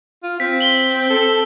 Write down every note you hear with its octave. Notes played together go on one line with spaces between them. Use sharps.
F4
C4 B6
F#7 G7
A4